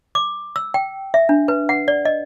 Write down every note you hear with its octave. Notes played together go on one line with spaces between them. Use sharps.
D6
E6
G5
E5
D4
B4
F#5
D5
D#5